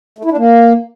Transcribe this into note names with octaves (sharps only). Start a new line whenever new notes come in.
A3
E4
D4
A#3